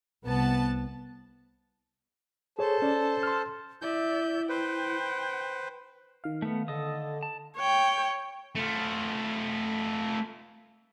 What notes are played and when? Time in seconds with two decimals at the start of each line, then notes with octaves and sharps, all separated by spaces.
0.23 C2 B3 A5
2.59 G#4 A4 C5 C#5 A5
2.82 C#4 D5
3.23 C6 F6
3.82 E4 D5 E5 G6
4.49 B4 C5 G5
6.24 D#3 F5
6.42 A3 B3
6.68 D3 A4 D#5 D#6
7.23 A5
7.57 C#5 G5
8.55 A3 F4